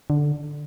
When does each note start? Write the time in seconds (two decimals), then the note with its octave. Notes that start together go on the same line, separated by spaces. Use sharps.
0.10 D3